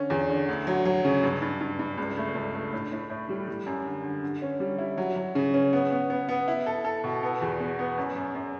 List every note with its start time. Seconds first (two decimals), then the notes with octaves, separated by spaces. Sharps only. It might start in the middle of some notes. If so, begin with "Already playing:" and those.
Already playing: D3 C#4
0.10 E2
0.29 D3
0.49 D2
0.67 F#3
0.85 F#3
1.05 C#3
1.23 G2
1.42 G2
1.61 G2
1.79 G2
1.98 C#2
2.17 A3
2.35 C#2
2.54 A3
2.73 A2
2.92 A2
3.10 A2
3.29 G3
3.48 G3
3.66 F#2
3.85 D3
4.04 D3
4.23 D3
4.42 C#4
4.60 G3
4.78 E4
4.97 F#3
5.16 F#3
5.35 C#3
5.54 C#4
5.73 B3
5.91 B3
6.10 B3
6.29 B3
6.48 E4
6.66 A4
6.85 A4
7.04 B2
7.23 B3
7.41 E2
7.60 B3
7.79 B3
7.98 F#2
8.16 F#2
8.35 F#2